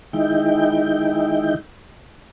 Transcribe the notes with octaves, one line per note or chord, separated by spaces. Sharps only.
D#3 G#3 D#4 E4 G5